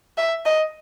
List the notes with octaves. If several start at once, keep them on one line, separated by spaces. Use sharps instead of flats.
E5
D#5